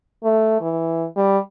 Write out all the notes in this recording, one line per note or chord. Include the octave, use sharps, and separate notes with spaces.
A3
E3
G3